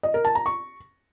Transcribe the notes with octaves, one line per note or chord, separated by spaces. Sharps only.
D#5
A#4
A5
A#5
C#6